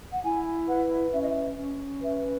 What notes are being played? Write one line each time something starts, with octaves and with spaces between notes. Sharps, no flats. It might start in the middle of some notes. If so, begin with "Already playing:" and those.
F#5
E4 G#5
B4 F#5
C#4 E5
D#5
E5
C#4
B4 E5